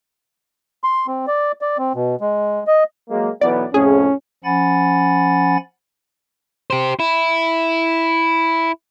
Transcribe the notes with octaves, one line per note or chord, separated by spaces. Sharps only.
C6
C4
D5
D5
C4
B2
G#3
D#5
F#3 G#3 A#3
B1 E3 B3 D5
F2 A2 C#4 G#4
F3 C#4 F#5 G#5 B5 A6
G4 C5
E4